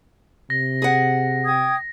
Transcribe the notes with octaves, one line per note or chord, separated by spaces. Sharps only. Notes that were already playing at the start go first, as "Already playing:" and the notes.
C3 A#6
G#4 F#5
G5 D#6 G#6